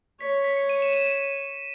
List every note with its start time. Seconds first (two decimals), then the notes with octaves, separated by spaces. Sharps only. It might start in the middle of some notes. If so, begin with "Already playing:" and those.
0.20 C#5 B6
0.32 B6
0.44 B6
0.57 C#7
0.69 D#7
0.82 E7
0.94 E7
1.07 D#7